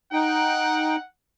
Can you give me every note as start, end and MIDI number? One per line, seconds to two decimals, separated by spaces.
0.13 0.96 63
0.13 1.06 78
0.13 0.96 79